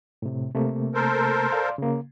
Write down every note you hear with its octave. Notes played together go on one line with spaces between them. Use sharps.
A2 C3
C3 A3 A#3
A4 A#4 C5
D5 F5 C6
C#3 A#3